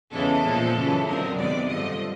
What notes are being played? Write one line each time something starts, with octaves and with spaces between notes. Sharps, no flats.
E2 C#3 E3 G#3 A4
A#2 F3 G#3
F#2 C#3 E3
F#2 D3 F3 G#3 C4 A#4
C3 D#3 G#3 B3 D5
G2 D3 F3 A3 D#5